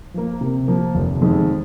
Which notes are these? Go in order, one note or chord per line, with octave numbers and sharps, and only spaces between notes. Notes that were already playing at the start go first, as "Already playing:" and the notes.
F3 A#3
C3
F3 A#3
F1
F2 D#3 G#3